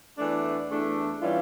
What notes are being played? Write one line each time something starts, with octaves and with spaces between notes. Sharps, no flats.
E2 E3 A3 D4
E2 E3 A3 D4
E3 G3 C#4 F4